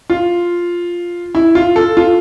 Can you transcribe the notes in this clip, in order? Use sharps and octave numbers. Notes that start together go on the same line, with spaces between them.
F4
E4
F4
A4
F4